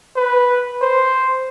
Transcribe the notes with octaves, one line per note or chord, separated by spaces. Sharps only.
B4
C5